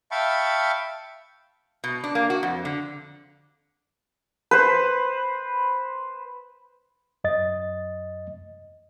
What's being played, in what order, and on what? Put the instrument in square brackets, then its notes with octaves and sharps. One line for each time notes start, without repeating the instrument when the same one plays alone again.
[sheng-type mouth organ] E5 F5 G5 A5 B5 C#6
[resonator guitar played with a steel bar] B2
D4
A#3
F#4
F2
D3
[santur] B4 C5
[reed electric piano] F#2 D#5 A6